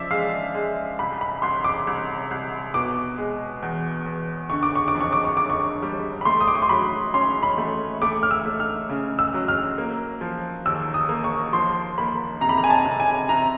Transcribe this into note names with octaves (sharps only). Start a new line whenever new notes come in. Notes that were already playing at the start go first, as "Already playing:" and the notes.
Already playing: C#3 F3 D5 E5
G#3 F5
G#3
C2 B5
B5
C2 C6
D6
C2
C2
B2 D6
G#3
E2
E2
D3 C#6
D6
C#6
D6
F2
C#6
D6
C#6
D3 D6
C#6
G3
B5
A3 C6
D#6
D6
C#6
C6
F#3 B5
C#4 C6
B5
A3
A3 D6
F6
E6
A3
F6
C#3
E6
F#3
F6
A#3
F3
D#2 E6
D#6
A#3
C#6
F3 C6
A#3 B5
C3 A#5
B5
A#5
G#5
A5
C3
G#5
C3 A#5